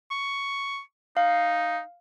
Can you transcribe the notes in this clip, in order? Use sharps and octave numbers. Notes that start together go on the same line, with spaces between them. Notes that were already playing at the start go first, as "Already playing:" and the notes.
C#6
D#4 F5